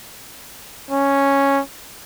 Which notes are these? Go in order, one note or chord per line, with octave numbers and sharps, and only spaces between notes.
C#4